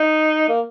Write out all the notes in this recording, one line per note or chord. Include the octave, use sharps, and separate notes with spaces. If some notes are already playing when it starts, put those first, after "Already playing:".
Already playing: D#4
A#3